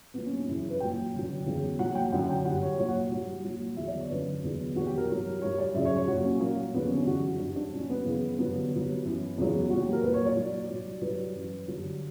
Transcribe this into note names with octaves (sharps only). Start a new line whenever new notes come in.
A#2 F#3 B3
C#4
D4
F#2 C#3 E3 E4
E4
B4
A#2 F#3 G5
F#2 D3 F#3
E2 C#3 F#3
A#2 F#3 F#5
G5
F#2 D3 F#3 F#5
G5
G2 F#3 F#5
C#5
A#2 F#3 C#5
F#5
G2 F#3
A#2 F#3
E2 D3 F#3 E5
D5
C#5
F#2 D3 F#3 B4
E2 D3 F#3
E2 B2 F#3 F#4
G4
A#4
G2 F#3
G2 F#3 C#5
D5
F#2 C#3 F#3 E5
C#5
C#5
A#2 F#3 F#4
C#4
A#2 F#3 A#3
E2 D3 F#3 B3
C#4
D4
F#2 C#3 E3 F#4
E4
G2 F#3 D4
D4
A#2 F#3 C#4
B3
F#2 C#3 E3
G2 D3 F#3 B3
G2 F#3
F#2 E3
E2 C#3 F#3
A#2 F#3 F#4
G4
A#4
A#2 F#3 B4
C#5
D5
A#2 F#3
G2 F#3
G2 F#3 B4
F#2 E3
G2 D3 F#3